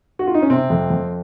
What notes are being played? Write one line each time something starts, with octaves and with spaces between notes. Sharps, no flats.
F#4
F4
D#4
C#4
C3 C4
F2
F2